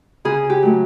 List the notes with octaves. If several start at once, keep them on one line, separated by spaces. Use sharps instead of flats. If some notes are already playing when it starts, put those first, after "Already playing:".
C#3 G#4
G4
F#3 A3